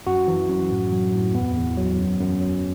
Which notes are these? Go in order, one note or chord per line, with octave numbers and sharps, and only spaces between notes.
F#2 F#4
E3
F#2
A2
F#3
A2
E2 B3
E2
F#3
F#2
F#2
F#3